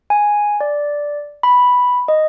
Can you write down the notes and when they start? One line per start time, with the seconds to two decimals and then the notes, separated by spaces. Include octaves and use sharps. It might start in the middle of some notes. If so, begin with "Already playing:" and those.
0.10 G#5
0.61 D5
1.43 B5
2.08 D#5